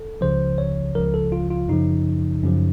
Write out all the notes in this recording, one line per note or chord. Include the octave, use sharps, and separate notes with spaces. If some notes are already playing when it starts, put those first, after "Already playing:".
Already playing: A4
C#2 C#3 F3 C5
C#5
C#2 C#3 F3 A#4
A4
F4
F4
F#2 C#3 F3 D#4
F#2 C#3 F3